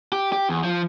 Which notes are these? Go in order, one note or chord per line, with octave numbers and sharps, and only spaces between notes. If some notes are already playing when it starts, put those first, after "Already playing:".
G4
G4
E2
F3